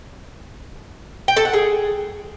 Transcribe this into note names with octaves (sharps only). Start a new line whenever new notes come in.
G5
A4
F#5
G#4